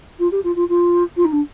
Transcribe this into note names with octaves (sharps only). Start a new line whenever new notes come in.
F4
G4
F4
F4
F4
F4
D#4
D4